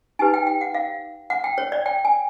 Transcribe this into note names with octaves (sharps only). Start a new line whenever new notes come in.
D#4 G4 B4 G#5
G5
G5
F#5
F5
F#5
G5
C#5
D5
G5
G#5